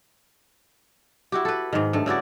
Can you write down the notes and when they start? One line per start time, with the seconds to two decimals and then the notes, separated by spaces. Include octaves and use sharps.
1.32 E4 F#4 G4
1.45 A4 B4
1.73 G#2 D#3
1.93 G2 A3
2.06 C#3 E4 F#4 D5